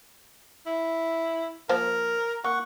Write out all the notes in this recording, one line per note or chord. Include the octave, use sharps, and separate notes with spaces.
E4
F3 A#3 A#4 C5
A#3 F#5 C#6